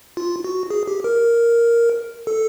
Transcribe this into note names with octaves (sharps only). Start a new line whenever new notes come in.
F4
F#4
G#4
G4
A#4
A4